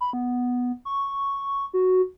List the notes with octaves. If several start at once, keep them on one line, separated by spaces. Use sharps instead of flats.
B5
B3
C#6
F#4